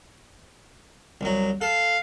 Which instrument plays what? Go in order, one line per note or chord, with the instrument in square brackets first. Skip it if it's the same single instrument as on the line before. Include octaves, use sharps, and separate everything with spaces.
[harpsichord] C2 F#3
[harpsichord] A4 [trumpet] F5